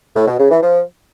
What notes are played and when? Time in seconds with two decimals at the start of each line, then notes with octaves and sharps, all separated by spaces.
0.16 A2
0.27 B2
0.39 C#3
0.50 E3
0.62 F3